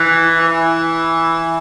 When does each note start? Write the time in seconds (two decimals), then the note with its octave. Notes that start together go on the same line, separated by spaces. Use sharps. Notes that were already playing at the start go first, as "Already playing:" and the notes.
Already playing: E3
0.39 E3